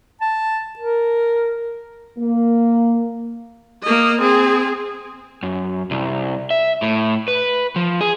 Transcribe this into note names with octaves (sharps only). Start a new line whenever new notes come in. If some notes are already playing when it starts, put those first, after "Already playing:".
A5
A#4
A#3
A#3 D#5
C4 G#4
F#2
C2
E5
A2
B4
F3
G#4